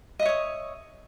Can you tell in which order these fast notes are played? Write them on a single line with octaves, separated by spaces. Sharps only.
D#5 E5 C#5 D#6